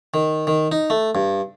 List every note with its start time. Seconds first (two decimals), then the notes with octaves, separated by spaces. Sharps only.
0.14 D#3
0.47 D#3
0.72 D#4
0.90 A3
1.15 G2